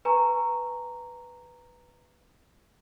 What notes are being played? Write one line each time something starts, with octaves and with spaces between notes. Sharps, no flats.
B4 G#5 A#5 C#6